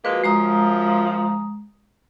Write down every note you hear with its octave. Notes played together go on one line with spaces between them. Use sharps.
F3 G#3 A#3 F#4 B4
F#2 F3 G#3 A#5 D#6